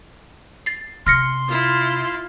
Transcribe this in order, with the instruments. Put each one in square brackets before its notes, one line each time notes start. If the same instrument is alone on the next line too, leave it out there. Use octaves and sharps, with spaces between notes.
[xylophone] A6 C7
[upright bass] C3 [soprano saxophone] C6 [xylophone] F6 A#6 C#7
[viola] E4 F4